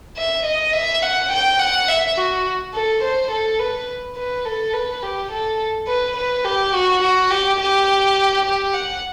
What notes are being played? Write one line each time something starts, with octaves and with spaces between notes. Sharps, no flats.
E5
D#5
E5
F#5
G5
F#5
E5
F#4
A4
C5
A4
B4
B4
A4
B4
G4
A4
B4
B4
G4
F#4
F#4
G4
G4
G4
F#5